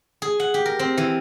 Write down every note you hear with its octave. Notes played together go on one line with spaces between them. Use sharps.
G#4
F#5
G4
A#4
C4
E3